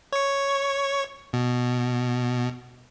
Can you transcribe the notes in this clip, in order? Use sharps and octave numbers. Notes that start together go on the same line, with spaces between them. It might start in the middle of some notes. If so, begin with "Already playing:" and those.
C#5 C#6
B2